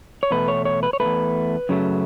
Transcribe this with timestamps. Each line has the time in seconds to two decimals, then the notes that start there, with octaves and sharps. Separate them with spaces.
0.23 C#5
0.31 E2 B2 A3 B4
0.48 C#5
0.65 C#5
0.83 B4
0.93 C#5
1.00 B2 A3 B4
1.05 E2
1.69 F#2 C#3 F#3 A3